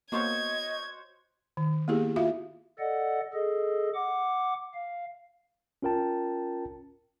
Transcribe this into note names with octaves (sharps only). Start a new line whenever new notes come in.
A#3 B3 F#4 C5 C#5 D#5 F5 G#6
D#3
A#3 B3 E4 G4 G#4
F4 F#4 E5 F5
A4 D5 D#5 F#5
G#4 A4 D#5
F#5 D6
F5
C#4 F4 A#4 G5 A5